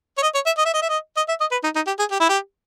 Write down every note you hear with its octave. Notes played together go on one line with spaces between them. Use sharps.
C#5
D#5
C#5
E5
D#5
E5
D#5
E5
D#5
D#5
E5
D#5
B4
D#4
D#4
G4
G#4
G4
E4
G4